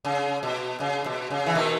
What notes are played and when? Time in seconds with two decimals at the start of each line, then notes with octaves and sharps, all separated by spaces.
0.05 C#3
0.43 B2
0.80 C#3
1.06 B2
1.30 C#3
1.46 E3
1.55 B2 D#3